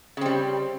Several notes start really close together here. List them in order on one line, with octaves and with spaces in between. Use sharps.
C#3 C4 G3